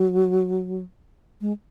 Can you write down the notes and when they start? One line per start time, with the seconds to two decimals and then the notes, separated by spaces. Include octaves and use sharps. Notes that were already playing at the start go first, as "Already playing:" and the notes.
Already playing: F#3
1.41 G#3